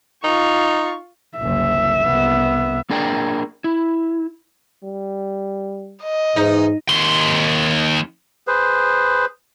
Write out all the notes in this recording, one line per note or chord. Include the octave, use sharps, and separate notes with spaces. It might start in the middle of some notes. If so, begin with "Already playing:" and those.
D#4 F4 C#6
F#1 C2 E5
C2 B3
A#3 D4 G#4 A#4 D5 G5
E4
G3
D#5
G#2 E3 D#4
D#2 C6
G#4 B4 C5